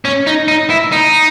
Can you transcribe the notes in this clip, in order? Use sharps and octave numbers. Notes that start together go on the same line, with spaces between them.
C#4
D#4
D#4
E4
D#4